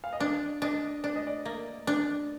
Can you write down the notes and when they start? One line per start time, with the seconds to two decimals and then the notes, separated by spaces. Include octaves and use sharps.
0.04 F5
0.13 D#5
0.20 D4 D5
0.62 D4 D#5
1.04 D4 D5
1.16 D#5
1.27 D5
1.45 A#3
1.87 D4